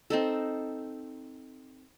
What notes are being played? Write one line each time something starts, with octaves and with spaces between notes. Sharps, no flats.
C4 D#4 A4